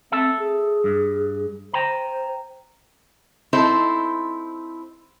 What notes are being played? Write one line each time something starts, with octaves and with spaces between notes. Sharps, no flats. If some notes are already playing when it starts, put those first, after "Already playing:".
C4 A4 E5
G#4
G2
C5 G5 A#5
C4 D#4 E4 A4 C5